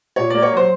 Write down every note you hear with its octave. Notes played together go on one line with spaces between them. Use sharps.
A#2 C#5
A#3 D5
C#5
F#3 C5